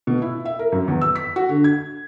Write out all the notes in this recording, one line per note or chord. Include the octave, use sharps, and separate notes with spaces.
B2
E4
E5
A#4
F#2
E2
E6
B6
F#4
D3
G#6